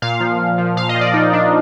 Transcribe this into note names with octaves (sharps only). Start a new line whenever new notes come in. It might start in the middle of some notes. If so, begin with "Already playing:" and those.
A#2 F5
F3
A#2
F3
A#2 F5
D#5
F3
D5
A#2 D#4
F3 D4